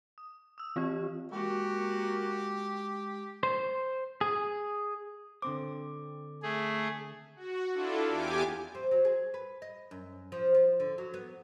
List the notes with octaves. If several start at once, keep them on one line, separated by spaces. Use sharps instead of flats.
D#6
D#6 E6
E3 C4 F4 G4 D#5
G#3 A#3 F#4 G4
C5
G#4
D3 C4 C5 D6
A3 G#4
F#4
D4 E4 F4 A4
E2 G4 G#5 D6
C4
F#3
G#4
B4
D#5
F#2
F3
F4
D3
F#3
B3